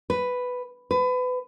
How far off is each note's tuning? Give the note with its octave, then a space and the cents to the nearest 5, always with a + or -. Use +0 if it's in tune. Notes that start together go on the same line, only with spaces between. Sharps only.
B4 +5
B4 +30